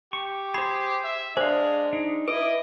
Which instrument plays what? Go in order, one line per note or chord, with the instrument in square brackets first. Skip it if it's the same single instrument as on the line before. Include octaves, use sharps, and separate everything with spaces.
[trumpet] G4 [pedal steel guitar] C#6
[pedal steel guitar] G#4 C5 [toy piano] B5
[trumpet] E5
[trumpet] G#3 [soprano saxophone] D4 [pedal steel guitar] G#4 F5 [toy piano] C5
[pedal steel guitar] D4 D#4
[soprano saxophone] E4 [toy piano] B4 [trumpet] D#5 [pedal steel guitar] D6